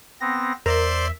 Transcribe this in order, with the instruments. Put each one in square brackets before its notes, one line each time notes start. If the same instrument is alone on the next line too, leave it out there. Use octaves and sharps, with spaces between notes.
[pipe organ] B3 C4 A#6
[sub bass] E2 [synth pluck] A#4 [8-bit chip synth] C5 D5 C6 [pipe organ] E5